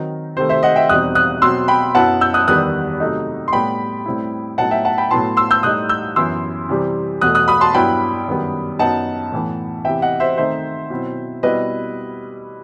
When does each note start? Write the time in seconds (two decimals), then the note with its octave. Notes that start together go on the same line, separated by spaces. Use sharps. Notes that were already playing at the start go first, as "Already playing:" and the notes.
Already playing: D#3 F#3 C4 D#4
0.37 C3 D#3 A3 C5
0.49 C5 E5
0.63 D#5 F#5
0.76 E5 G5
0.89 E2 B2 G3 C4 D#4 D#6 F#6
1.15 D#6 F#6
1.42 B2 F#3 C4 C6 E6
1.68 G5 B5
1.95 F#2 F#3 B3 E4 F#5 A5
2.21 E6 G6
2.34 D#6 F#6
2.47 E2 D#3 G3 B3 D#6 F#6
3.00 C3 F#3 A3 D#4
3.48 C6
3.53 A2 G3 B3 G5 B5
4.06 A2 G3 C4 E4
4.58 A2 F#3 B3 D#4 F#5 A5
4.71 E5 G5
4.85 F#5 A5
4.98 G5 B5
5.11 A2 F#3 B3 E4 A5 C6
5.37 C6 E6
5.51 E6 G6
5.63 A2 G3 D#4 D#6 F#6
5.89 E6 G6
6.16 F#2 E3 B3 E4 C6 E6
6.69 C3 E3 G3 C4
7.21 E2 B2 A3 D#6 F#6
7.35 D#6 F#6
7.48 B5 D#6
7.61 A5 C6
7.74 G2 F#3 B3 E4 G5 B5
8.28 F#2 D#3 G3 B3
8.79 F#2 F#3 B3 D#4 F#5 A5
9.32 A2 E3 B3
9.85 C3 E3 B3 E5 G5
10.02 D#5 F#5
10.20 C5 E5
10.37 D#3 A3 C4 D#4 C5 E5
10.90 B2 F#3 C4 E4
11.43 B2 G3 C4 E4 B4 D#5